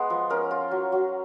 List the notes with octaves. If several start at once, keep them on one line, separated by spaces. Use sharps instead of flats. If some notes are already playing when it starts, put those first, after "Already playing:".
Already playing: G#3 B3
F3
C#4 A#4
F4
F#3
F#3